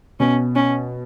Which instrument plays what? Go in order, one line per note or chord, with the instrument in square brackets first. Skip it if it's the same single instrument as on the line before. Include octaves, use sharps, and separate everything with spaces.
[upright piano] B2 [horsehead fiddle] C#4
[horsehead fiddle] C#4